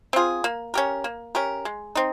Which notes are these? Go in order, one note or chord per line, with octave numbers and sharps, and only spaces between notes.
C4 F4 G#4
A#3
C#4 G4 A#4
A#3
C#4 G4 A#4
G#3
C4 D#4